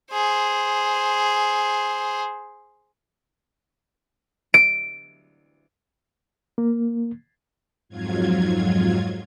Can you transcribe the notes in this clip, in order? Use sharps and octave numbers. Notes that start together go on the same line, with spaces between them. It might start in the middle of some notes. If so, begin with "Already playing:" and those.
G#4 C5
D7
A#3
F2 G#2 F#3 F4 G#6